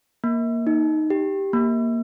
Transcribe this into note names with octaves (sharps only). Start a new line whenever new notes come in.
A#3
D#4
G4
A#3